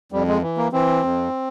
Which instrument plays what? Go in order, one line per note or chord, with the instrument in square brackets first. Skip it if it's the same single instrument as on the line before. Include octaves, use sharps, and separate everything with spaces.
[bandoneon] F2 G3
G#3
E3
A#3
E3 C4
F2